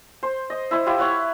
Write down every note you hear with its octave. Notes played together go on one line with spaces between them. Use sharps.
C5
D#5
E4 C5 D#5
E4 F4 G4
C#5 F#5